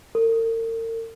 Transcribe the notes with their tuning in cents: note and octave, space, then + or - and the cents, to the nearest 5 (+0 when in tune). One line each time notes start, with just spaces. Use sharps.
A#4 -45